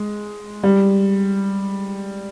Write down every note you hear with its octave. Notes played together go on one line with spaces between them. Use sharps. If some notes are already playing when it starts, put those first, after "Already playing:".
Already playing: G#3
G3